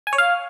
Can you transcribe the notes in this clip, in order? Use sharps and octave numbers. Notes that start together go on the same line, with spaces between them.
G#5
C#5
F5